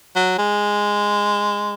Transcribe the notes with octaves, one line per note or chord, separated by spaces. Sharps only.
F#3
G#3